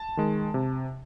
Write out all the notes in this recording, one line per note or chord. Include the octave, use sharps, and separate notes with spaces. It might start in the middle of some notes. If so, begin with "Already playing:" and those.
Already playing: A5
D#3 G#3
C3